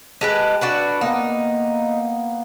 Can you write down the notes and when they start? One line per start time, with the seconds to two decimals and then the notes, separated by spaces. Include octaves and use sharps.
0.21 G#3 G4 A4 B4
0.61 D4 F#4 B4
1.01 A#3 B3 D#4